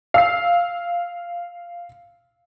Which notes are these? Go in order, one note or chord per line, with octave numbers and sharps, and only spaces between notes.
F5 E6 C7